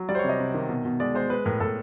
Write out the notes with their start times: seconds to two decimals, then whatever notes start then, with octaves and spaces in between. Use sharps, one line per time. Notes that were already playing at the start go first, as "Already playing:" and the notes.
Already playing: F#3
0.09 G3 D5
0.15 C5
0.19 C3 C#5
0.29 D#5
0.39 C3
0.54 D#3
0.69 B2
0.85 B2
1.00 G#3 D5
1.15 G#3 C5
1.30 G#3 B4
1.45 A2 A#4
1.60 A2 A4